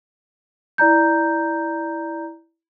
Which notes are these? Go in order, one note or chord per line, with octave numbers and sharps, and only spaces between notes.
E4 D5 A#5 G6